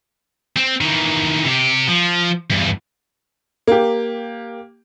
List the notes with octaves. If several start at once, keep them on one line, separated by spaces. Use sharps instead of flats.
C4
D#3 E3
C3 G4
F3
E2 G2
A#3 G4